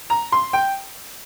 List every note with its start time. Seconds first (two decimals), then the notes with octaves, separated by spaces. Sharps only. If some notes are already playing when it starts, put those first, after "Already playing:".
0.10 A#5
0.32 C6
0.53 G5